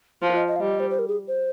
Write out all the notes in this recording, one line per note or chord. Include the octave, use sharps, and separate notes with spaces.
F3 F4
D#5
D#5
F5
G3 D#5
C5
C5
A#4
G#4
C5